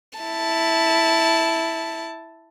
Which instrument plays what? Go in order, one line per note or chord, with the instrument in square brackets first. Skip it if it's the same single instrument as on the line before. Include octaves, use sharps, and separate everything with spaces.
[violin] E4 A5